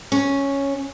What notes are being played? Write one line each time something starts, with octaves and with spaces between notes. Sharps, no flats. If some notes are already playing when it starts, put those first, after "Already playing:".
C#4